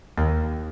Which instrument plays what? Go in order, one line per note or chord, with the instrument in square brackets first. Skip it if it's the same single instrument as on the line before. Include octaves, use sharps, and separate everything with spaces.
[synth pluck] D#2